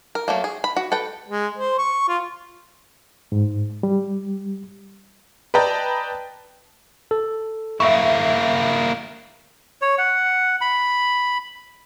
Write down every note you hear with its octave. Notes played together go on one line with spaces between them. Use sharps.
A#4
F#3 A3 A#3
G#4
B5
F#4
A4 B4 G5
G#3
C5
C#6
F4
G#2
G3
B4 D5 D#5 G5 A5 A#5
A4
A#3 E4 E5 C#6
C#5
F#5
B5